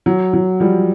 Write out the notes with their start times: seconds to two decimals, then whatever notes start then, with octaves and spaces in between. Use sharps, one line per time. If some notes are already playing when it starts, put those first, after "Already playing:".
0.06 F#3
0.34 F#3
0.60 F3 G3